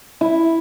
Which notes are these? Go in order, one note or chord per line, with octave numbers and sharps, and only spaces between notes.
E4